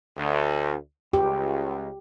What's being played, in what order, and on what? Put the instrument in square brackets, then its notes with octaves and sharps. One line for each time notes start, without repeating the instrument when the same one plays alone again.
[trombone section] D2
[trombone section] C#2 [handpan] G4